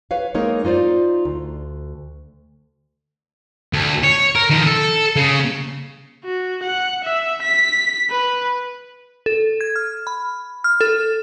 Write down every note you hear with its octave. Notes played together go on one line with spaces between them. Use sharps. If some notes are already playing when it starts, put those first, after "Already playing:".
B4 C#5 F5
G#3 A#3 D#4 A#4 C#5
D#4 F4 C5 D5
D2
D2
C#5
A#4
D#3 F3
A4
C#3
F#4
F#5
E5
B6
B4
A4
G#6
F6
B5
F6
A4